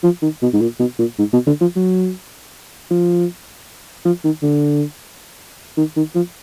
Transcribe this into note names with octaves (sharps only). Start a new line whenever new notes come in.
F3
D#3
B2
G#2
A#2
B2
A#2
G#2
B2
D3
F3
F#3
F3
F3
D#3
D3
D#3
D#3
F3